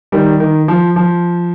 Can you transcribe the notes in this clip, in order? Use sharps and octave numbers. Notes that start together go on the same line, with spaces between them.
D#3 G3
D#3
F3
F3